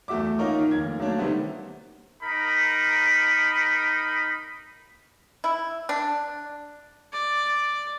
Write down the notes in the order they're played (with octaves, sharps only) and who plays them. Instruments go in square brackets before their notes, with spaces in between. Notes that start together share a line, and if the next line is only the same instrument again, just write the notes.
[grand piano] E2 A3 F#4 E5 D6
A#3 C#4 D#4 F4 A#4 C#5
D#3
F1 A#3 G#6
F#3 A3 A#3 C#4 D4
C3 D#3 G3 A3 B3 C4
[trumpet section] D#4 A#4 B5
[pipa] E4
D4
[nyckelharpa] D5